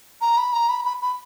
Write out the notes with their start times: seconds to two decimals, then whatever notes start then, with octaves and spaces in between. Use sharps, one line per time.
0.21 A#5
0.38 B5
0.53 A#5
0.69 B5
0.85 B5
1.02 B5